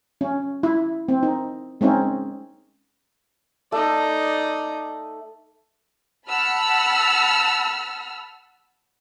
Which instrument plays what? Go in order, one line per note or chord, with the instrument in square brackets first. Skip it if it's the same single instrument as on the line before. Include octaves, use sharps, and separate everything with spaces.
[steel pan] C#4
E4
C4
D#4
G#3 C4 C#4 D#4
[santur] A3 [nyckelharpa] D#4 D5
[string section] F#5 A5 B5 E6 F6